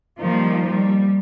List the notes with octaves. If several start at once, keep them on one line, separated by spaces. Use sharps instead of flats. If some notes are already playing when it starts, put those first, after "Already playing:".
D#3 F3 G3 A#3
G3